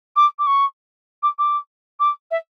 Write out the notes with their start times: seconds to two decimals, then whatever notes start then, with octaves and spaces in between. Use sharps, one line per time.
0.16 D6
0.39 D6
0.47 C#6
1.23 D6
1.39 D6
2.00 D6
2.31 E5